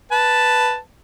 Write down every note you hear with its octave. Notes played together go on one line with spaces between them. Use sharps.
B4 A5